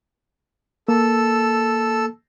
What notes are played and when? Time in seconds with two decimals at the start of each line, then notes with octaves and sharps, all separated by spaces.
0.88 A#3 A4 E6